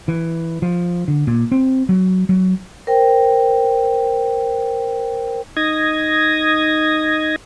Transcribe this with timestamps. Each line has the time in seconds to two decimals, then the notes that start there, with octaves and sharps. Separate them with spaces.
0.08 E3
0.62 F3
1.08 D3
1.27 A#2
1.51 C4
1.89 F#3
2.29 F#3
2.87 A#4 C5 G5
5.57 D#4 D#6 G#6 A#6